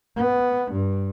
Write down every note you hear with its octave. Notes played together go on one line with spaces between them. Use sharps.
B3
G2